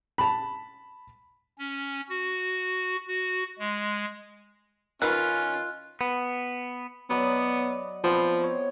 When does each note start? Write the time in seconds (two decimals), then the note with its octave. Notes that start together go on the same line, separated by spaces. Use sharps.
0.18 A5 B5
1.58 C#4
2.09 F#4
3.07 F#4
3.59 G#3
5.02 D#3 C#4 F4 B4 F#6
6.01 B3
7.10 F#3 B3 D5 D#5
8.04 F3 B3 C4
8.43 C#5